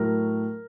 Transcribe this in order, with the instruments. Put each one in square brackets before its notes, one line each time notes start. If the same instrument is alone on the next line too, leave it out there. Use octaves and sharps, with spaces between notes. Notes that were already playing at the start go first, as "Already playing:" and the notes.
Already playing: [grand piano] A2 F#3 A#4